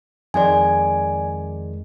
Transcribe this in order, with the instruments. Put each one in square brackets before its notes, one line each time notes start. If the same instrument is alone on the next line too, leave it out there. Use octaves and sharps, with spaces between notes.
[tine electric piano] F2 D#3 G#3 [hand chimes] D5 G#5